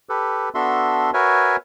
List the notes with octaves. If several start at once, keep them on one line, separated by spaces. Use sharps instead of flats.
G4 A4 B4
B3 D4 F#4 A4 E5 C6
F#4 A#4 B4 C#5 E5 G#5